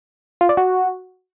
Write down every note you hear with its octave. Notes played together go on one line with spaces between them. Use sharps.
F4
D5
F#4